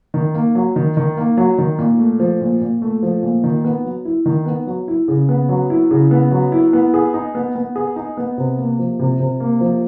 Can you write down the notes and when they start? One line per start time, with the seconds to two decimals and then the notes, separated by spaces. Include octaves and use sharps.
0.14 D#3
0.34 A#3
0.55 F#3
0.76 D#3
0.97 D#3
1.17 A#3
1.37 F#3
1.58 D#3
1.78 A#2
1.99 A3
2.20 F3
2.41 A#2
2.61 A#2
2.82 A3
3.02 F3
3.23 A#2
3.44 D#3
3.65 B3
3.84 F#3
4.05 E4
4.26 D#3
4.46 B3
4.67 F#3
4.88 E4
5.08 C#3
5.29 B3
5.49 F#3
5.70 E4
5.91 C#3
6.11 B3
6.31 F#3
6.52 E4
6.73 B3
6.94 G#4
7.14 D#4
7.35 B3
7.55 B3
7.76 G#4
7.96 D#4
8.17 B3
8.38 C3
8.58 A#3
8.79 F3
8.99 C3
9.20 C3
9.40 A#3
9.60 F3